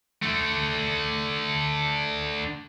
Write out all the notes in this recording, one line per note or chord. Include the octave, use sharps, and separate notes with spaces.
D3 A3